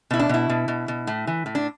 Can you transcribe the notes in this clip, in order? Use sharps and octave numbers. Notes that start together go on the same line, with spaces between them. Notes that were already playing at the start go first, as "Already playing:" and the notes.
B2 E4
D4
B2 E4
B2
B2
B2
A2
E3
A2
D4